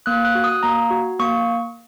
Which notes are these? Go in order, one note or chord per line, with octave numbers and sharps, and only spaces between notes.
A#3 F#6
F#6
F#4
D#6
A#3 A#5
F#4
A#3 C#6